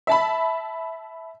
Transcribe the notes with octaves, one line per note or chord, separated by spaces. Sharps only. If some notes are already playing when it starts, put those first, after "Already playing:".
E5 A5 B5